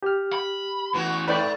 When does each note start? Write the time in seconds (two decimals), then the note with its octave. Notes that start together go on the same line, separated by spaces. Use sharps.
0.03 G4 F6
0.33 B5
0.94 A2 E3 B3 F#4
1.28 G#2 A3 B4 D5 G5 B5